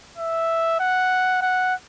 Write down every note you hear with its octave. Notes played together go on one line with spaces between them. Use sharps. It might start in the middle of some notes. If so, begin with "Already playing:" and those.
E5
F#5
F#5